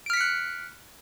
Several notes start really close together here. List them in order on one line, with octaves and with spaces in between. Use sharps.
D7 F6 B6 C#7 F#6